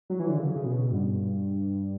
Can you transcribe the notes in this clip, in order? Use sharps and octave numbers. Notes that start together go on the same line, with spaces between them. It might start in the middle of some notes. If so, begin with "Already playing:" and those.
F#3
E3
D3
C#3
C#3
B2
G2